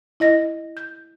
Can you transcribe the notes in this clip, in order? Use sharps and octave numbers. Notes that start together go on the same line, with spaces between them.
E4 D#5 A#6
G6